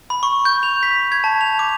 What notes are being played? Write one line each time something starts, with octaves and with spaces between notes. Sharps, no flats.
B5
C#6
G6
F7
B6
G#6
A5
F7
D6